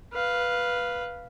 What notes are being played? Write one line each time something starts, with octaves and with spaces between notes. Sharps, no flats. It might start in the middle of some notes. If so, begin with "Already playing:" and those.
B4 F5